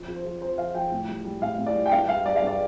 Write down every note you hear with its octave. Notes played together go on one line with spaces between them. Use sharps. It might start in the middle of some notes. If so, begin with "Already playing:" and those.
Already playing: F2
F3
C5
F3
F2 C5
F2 F5
F3 G5
A2
G3
G3
A2 F5
A2
D5
G3
G5
G2 F5
G3 F5
G3 D5
F5
G2
D5